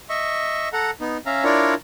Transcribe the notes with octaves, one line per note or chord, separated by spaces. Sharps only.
D#5 E5 C#6
A4 F#5 A#5
B3 D#4
C#4 E5 F5 A#5
D4 E4 F4 A#4 C#5 D5